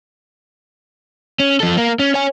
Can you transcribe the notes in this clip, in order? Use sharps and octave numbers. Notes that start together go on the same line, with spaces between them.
C#4
F3 A4
A#3 A#4
C#4
C#5 G#5